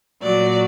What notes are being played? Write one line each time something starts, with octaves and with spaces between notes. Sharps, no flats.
A#2 F#3 D5